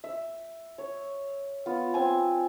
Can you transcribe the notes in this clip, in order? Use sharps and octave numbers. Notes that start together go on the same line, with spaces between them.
E5
C#5
B3 F4
C4 G#5